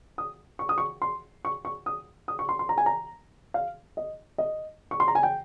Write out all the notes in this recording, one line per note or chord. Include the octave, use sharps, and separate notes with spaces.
D#6
C#6
D#6
C#6
C6
C#6
C#6
D#6
D#6
C#6
C6
C6
A#5
G#5
A#5
F5
D#5
D#5
C#6
C6
A#5
G#5
G5